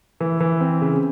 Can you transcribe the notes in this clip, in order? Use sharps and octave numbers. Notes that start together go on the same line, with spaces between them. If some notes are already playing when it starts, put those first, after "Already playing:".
E3
E3
C4
C#3